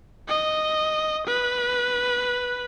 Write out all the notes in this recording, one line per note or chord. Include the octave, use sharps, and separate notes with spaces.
D#5
B4